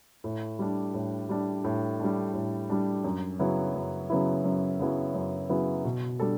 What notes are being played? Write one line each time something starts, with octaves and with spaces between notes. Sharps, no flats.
A2
G3 D4
A2
G3 D4
A2
G3 D4
A2
G3 D4
F#2
C#3 F#3 B3 E4
F#2
C#3 F#3 B3 E4
F#2
C#3 F#3 B3 E4
F#2
C#3 F#3 B3 E4
B2
G3 D4 A4